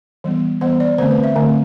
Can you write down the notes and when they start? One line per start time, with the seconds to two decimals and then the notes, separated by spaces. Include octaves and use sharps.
0.24 E3 G3 B3
0.61 E3 G3 B3 C5
0.80 D5
0.98 D3 A3 C4 C5
1.11 B4
1.24 E5
1.36 D3 A3 C4